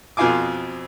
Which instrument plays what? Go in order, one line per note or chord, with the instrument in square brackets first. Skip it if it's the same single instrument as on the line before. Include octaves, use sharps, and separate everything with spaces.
[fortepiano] F2 B2 F4 F5 G#5 D6